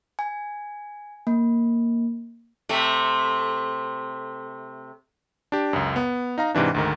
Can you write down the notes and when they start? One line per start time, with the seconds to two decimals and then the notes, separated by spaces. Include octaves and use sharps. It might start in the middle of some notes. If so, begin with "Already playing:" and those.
0.19 G#5
1.27 A#3
2.69 C3 A3
5.52 D4 G4
5.73 C#2 F#2
5.96 B3
6.38 D#4 F5 A#5
6.55 G#2 C3 E3 D4
6.74 D2 G#2 D#3